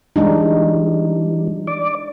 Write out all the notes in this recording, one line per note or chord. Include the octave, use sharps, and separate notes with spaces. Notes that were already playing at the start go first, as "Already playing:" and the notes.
E3 G3 G#3 D4 D#4
D5 D6